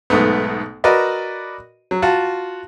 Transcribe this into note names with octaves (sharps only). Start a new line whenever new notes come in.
B1 G#2 A3 B3
F#4 A#4 B4 D5 D#5
F#3
F4 F#4 A5